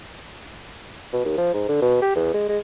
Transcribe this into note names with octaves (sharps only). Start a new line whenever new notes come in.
B2
D#2
F3
G#2
D3
B2
G4
E2
G#3
G#3